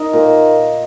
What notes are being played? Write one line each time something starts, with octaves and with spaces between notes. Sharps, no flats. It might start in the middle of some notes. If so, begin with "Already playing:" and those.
Already playing: D#4 A#4
A#2